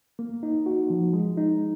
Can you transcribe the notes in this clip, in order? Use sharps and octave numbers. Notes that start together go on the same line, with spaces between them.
A#3
D#4
F#4
F3
G#3
D#4